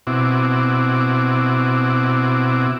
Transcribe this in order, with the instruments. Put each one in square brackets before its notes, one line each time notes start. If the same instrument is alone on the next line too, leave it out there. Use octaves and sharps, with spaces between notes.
[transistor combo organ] B2 C4 E4 F#4 D6